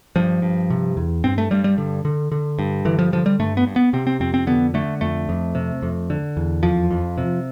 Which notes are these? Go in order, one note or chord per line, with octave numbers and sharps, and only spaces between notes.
G2 F3
G2
C3
E2
G2 C4
A3
G2 G3
G3
D3
D3
D3
G2
D3 E3
F3
D3 F3
G3
G2 A3
B3
G2
B3
C3 C4
C4
F2 C4
C4
D3 B3
D3 A3
F2 A3
F2
C3
F2
D3
E2
F2 F3
F2
C3